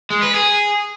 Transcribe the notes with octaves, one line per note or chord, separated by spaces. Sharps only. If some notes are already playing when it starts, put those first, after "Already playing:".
G#3
B4
G#4